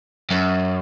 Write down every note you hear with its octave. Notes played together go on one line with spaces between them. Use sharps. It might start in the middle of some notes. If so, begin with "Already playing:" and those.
F#2